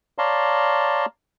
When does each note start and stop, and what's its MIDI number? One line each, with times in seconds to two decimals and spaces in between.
0.18 1.06 73
0.18 1.06 74
0.18 1.06 77
0.18 1.06 81
0.18 1.06 82
0.18 1.06 84